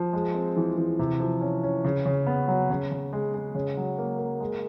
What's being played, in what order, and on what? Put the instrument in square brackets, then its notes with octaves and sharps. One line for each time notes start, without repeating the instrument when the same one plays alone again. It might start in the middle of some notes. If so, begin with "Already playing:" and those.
Already playing: [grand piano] F3
G#3
C4
E3
E3
C3
F3
C#4
C#4
C#3
C#3
B3
F#3
C#3
C#3
G#3
G#3
C#3
F#3
A#3
A#3
G#3